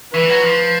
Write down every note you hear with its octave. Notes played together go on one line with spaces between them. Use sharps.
E3 B4
F#3
F3